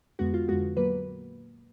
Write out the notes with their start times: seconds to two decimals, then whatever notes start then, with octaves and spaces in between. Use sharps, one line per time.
0.19 F2 D3 G#3 B3 F#4
0.34 F4
0.48 F2 D3 G#3 B3 F#4
0.77 A#2 F#3 A#3 B4